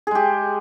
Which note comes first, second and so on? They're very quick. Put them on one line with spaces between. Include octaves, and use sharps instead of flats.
G#4 G#3 G4